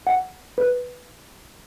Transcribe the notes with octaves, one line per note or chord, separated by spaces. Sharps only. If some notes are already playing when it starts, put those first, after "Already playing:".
F#5
B4